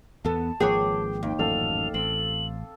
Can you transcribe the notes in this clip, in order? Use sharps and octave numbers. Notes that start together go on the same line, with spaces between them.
E2 B3 A4 A5
G#1 F3 A#3 G#4 B4 C#5 G5 D6
D#2 G5
A1 F#2 A#2 A4 F5 F7
A1 C4 F#7